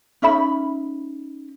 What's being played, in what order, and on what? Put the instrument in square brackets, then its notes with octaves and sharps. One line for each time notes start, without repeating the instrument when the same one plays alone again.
[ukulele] C#4 D#4 E5 B5